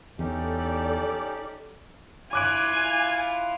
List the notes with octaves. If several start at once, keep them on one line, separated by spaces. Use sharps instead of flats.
E2 C#4 D#4 G4 A4 D5
E4 F4 G#5 D6 F#6 D7